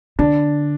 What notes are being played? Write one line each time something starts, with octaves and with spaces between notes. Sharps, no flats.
D3 D4